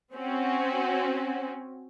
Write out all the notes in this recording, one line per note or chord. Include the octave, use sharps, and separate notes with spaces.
C4 C#4 F#4